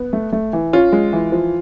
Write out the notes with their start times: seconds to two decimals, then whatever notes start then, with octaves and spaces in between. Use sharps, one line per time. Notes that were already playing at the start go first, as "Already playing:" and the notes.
Already playing: B3
0.13 A3
0.33 A3
0.53 E3
0.73 C#4 F4
0.92 G#3
1.13 E3
1.32 F3